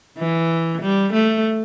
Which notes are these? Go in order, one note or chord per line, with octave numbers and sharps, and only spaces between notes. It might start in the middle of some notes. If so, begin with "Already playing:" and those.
E3
G3
A3